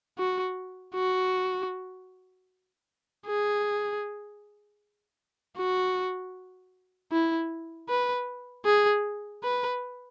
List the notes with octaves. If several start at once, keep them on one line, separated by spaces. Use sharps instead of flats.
F#4
F#4
G#4
F#4
E4
B4
G#4
B4